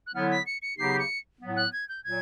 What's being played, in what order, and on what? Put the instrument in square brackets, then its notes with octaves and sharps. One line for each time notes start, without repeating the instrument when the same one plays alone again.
[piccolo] F#6
[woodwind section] D3 F#3 B3 E4 [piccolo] F6
[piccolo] B6
C#7
C#7
[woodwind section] C#3 F#3 B3 D#4 G4 [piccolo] C7
[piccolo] C#7
[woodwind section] A2 F#3 B3
[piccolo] F#6
G#6
G6
[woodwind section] A#2 F#3 [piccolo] G#6